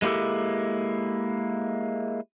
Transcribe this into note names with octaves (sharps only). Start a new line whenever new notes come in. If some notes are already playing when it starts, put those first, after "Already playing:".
G#3 A#3 E4 G4 A4